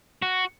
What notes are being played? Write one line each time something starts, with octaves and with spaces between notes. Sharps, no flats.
F#4